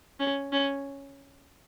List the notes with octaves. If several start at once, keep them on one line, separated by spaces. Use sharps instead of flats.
C#4
C#4